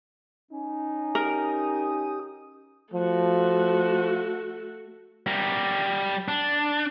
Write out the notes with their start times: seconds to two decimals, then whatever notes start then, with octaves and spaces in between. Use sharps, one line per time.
0.51 C#4 D#4
1.15 G4 A#4 D#6
2.94 F3 A3 F#4
5.27 G3 A#4
6.28 D4